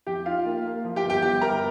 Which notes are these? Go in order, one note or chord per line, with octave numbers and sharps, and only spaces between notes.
F2 G4 G5
D#4 F4 F5
A#3
A#3
F3
G4 G5
G1
G4 G5
G1 G4 G5
G1 A#4 A#5